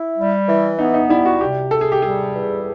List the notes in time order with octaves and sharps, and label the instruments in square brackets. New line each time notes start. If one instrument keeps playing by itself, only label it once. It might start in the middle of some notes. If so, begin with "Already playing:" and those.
Already playing: [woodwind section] E4
G3
E3
[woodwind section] B3 [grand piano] D#4
[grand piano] D#4
[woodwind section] G3 [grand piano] E4
[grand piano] F#4
[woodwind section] C3 [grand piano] G4
[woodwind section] C3 [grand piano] A4
[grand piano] G#4
G4
[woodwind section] G3 [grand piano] G#4
[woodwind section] E2